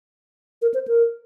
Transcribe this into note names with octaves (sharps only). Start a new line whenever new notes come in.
A#4
C5
A#4